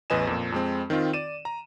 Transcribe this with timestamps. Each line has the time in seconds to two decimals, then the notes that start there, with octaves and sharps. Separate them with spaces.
0.10 A1 E2 B4 D#5 G#5 E7
0.27 F2 A#2
0.52 F2 G#3 C4
0.90 D#3 C4 D#4 F4
1.13 D5 D#7 E7
1.45 A#5